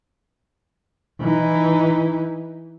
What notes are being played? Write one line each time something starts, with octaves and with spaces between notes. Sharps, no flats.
E3 D#4